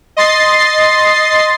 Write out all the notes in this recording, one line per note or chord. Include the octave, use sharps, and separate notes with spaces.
D#5 C6 A6 C7